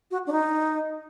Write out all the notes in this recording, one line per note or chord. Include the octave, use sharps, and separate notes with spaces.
F#4
D4
D#4